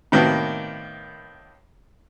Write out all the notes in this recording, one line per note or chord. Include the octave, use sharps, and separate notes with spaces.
A2 C3 D#3 A#3 B3 F#4